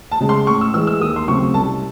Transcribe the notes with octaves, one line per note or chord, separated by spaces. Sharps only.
A5
C#3 G#3
C6
A2 C#6
E6
E3 G#3 E6
E6
D#2 D#6
C6
C#3 F#3 A3 C4 C#6
C2 A5